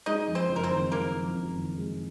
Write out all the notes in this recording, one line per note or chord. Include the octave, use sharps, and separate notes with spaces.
G#3 D#4 D#5
F2
C4 C5
F#1
A#4
C4 C5
D#3
G#3 A#3 A#4
F2
F#1
D#3
G#3